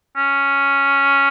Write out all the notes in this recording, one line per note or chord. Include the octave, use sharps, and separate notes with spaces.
C#4